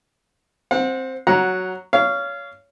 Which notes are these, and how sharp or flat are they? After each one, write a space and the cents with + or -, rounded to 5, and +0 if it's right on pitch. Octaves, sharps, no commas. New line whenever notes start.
C4 +5 F#5 -35
F#3 +5 F#5 -5 A#5 +10
C#5 +25 F5 -15